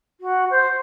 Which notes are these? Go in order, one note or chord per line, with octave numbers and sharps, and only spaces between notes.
F#4
C5